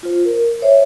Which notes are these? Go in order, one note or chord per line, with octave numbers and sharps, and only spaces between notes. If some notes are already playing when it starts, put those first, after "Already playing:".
F4 C5
A#4
C5 C#5 E5